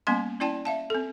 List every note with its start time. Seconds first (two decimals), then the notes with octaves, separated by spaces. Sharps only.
0.07 G3 A#3 B3 C#4 G#5 C6
0.40 C#4 E4 D5 G5 A5
0.65 E5 F5 A5
0.90 C4 A4